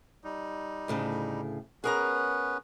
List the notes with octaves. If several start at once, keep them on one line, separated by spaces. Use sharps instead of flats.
G3 D#4
D2 A2 C#3
B3 C#4 G#4 A#4 B4 A#5